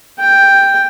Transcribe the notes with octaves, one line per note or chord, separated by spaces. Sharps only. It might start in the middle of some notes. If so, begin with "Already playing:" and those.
G5